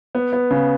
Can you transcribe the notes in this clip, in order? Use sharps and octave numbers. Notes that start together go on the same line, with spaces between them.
B3
B3
C#3